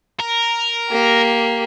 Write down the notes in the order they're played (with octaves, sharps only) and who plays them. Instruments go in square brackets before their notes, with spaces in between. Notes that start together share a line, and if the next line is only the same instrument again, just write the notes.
[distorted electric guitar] A#4
[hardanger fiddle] A#3 G4